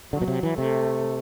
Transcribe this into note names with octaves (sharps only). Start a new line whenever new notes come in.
D3 F#3
B2
C3
E3
C3 A3